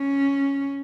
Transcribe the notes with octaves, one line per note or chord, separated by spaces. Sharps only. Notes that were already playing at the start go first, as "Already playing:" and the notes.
Already playing: C#4